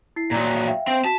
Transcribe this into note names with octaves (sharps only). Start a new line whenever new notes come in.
E4 C7
A#2 F#3 D5 A#5
E5 F5 G5
C4
F#4 A5 B6